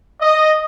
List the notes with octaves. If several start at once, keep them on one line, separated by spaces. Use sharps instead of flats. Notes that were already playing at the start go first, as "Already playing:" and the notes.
D#5